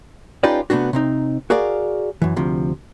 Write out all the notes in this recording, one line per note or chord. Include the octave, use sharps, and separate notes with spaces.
C#4 D#4 F4 G4 B4 D5
C3 A3 B3 D4 F#4
C3 C4 D#4
F#4 G#4 A#4 D5 F5
F#2 E3
D2 C3 F3